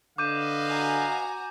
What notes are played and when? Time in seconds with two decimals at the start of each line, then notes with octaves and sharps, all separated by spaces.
0.18 D3 B4 D#5 F5 D6 G6 D#7
0.69 F#4 G#5 A#5